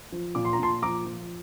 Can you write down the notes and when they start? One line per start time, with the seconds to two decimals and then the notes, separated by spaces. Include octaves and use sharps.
0.12 F3
0.35 A#2 D6
0.45 C6
0.53 A#5
0.59 A#2 A5 C6
0.82 F3 A#5 D6
1.06 F3